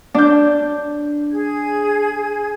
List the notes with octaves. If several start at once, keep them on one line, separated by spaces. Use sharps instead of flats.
D4 G6
G#4 G#6